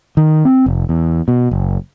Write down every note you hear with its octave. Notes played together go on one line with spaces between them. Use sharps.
D#3
C4
F1
E2
B2
F#1